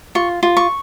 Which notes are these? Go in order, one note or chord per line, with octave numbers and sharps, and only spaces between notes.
F4 C#6
F4
C#6